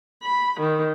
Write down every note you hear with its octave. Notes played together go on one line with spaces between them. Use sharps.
B5
D#3